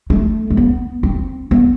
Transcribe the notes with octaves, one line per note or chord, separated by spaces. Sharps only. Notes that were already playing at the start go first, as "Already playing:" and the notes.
A3
A3
B3
C4
B3